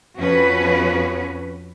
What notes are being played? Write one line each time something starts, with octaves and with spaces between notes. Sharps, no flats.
F2 F3 C#4 F#4 B4